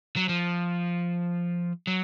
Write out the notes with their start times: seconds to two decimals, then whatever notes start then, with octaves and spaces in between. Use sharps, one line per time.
0.16 F#3
0.29 F3
1.87 F#3